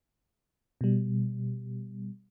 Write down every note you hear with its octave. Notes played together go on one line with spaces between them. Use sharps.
B2 G3